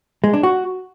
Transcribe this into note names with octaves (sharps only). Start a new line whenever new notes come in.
G#3
D4
F#4